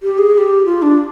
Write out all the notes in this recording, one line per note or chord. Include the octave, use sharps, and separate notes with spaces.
G4
G#4
G#4
G4
F4
D4